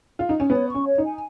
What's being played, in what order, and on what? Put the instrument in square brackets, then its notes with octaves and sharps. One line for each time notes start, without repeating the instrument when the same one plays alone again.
[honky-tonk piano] F4
D#4
C#4
[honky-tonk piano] B3 [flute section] C#5
[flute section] C#6
[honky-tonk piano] C#4
[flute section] C#5
[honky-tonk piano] D#4
[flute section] G#5